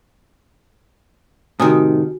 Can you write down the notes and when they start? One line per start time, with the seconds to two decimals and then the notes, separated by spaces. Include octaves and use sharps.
1.60 A2 C3 D#3 F#4 G#5 D#6